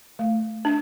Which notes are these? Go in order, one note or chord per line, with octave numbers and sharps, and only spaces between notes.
A3
D4